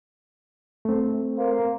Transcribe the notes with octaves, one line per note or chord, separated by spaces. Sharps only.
A3 C4
A#3 C5